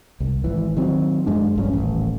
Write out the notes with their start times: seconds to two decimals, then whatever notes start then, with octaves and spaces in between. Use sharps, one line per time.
0.20 C2
0.44 G#1 E3
0.77 D#3 F#3 C4
1.26 F#2 G#3 D4
1.56 A#1 G2 C#4
1.73 D#1 A1